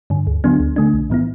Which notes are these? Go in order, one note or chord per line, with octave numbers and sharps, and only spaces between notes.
G2 D3
D2
D3 F#3 B3 D4
D2
D3 A3 D4
B1
A2 E3 B3 E4